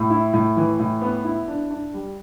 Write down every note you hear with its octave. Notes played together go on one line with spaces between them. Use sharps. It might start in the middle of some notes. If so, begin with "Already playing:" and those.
Already playing: A2
E4
A2
E3
A2
B3
E4
D4
D4
G3